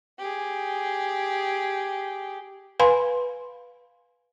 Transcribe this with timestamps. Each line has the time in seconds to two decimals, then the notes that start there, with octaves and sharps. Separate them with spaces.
0.19 G4 G#4
2.80 B4 F5 G#5 B5 C6